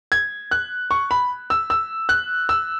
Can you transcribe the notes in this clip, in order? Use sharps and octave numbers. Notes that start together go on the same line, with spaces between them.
G#6
F#6
C#6
B5
E6
E6
F#6
E6